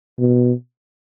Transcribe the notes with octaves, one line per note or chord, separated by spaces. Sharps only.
B2